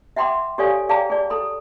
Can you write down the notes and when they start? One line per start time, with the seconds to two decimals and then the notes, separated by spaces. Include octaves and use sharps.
0.16 E5 F#5 G5 B5 C6 D6
0.58 G4 A4 C#5 D5 F5 G#5
0.89 G#4 D5 F5 G5 A5 A#5
1.10 G#4 D5
1.30 A4 B5